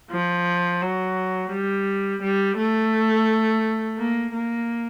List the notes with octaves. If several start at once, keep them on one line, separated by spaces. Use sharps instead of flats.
F3
F#3
G3
G3
A3
A#3
A#3